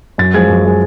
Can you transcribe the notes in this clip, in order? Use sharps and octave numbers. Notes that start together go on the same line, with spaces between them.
F#2 A6
F3 G#3 G#6
F#2
F3 G#3